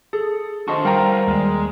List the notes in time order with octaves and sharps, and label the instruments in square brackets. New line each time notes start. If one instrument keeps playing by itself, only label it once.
[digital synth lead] G#4 [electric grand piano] A4
[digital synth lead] D4 [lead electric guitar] F#4 C5 [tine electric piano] D#5 C#6
[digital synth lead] G3 [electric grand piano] A#4 G5 A#5 [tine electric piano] F5
[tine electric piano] D#2 [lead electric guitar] G#3